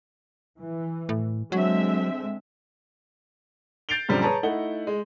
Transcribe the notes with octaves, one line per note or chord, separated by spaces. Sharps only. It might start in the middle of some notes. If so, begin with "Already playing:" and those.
E3
A2
D3 F#3 G#3 C4 E5
G6 A6 C7 D7 F7 G7
F#2 A#2 D3 F3 G3 C4
G#4 B4 C#5 A5 A#5
A3 D#4 E4 F#5 G7
G#3